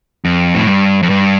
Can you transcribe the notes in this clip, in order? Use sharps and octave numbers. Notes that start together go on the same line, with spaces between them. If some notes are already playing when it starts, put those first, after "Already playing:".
F2
A2
G2
F2
G2